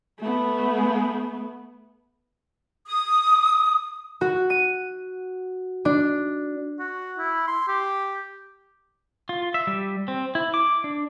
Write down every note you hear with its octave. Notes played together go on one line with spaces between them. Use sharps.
A3 B3
D#6
F#4
D#7
D4
F#4
E4
C6
G4
F4
E5
G3
C4
E4
D6
D4